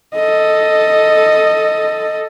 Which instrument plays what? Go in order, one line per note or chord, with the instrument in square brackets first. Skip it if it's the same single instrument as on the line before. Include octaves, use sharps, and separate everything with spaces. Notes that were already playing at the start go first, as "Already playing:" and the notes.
[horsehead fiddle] A4 D#5